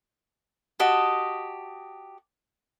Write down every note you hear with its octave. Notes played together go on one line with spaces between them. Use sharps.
F#4 G4 D#5 A5